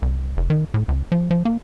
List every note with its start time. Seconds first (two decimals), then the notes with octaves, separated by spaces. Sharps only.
0.02 C2
0.37 F1
0.50 D#3
0.74 A2
0.88 C#2
1.12 F3
1.31 F3
1.45 A#3